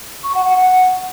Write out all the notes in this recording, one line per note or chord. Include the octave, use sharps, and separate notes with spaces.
C#6
F#5
F#5
F#5